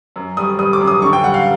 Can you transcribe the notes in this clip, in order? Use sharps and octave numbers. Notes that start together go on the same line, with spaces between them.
F#2
G3 D#6
G3 D#6
D6
F#2
D#6
D3 C#6
G5
G3 F#5
F5